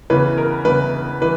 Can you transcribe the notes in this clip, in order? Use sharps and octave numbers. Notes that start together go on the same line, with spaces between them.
E2 C#3 E3 B4
A#4
E2 C#3 E3 B4
E3 B4